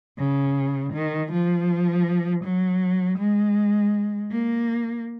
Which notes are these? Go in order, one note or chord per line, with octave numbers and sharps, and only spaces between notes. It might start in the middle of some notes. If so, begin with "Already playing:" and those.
C#3
D#3
F3
F#3
G#3
A#3